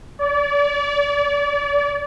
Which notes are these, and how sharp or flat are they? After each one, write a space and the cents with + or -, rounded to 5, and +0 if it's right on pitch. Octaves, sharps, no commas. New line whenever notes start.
D5 -35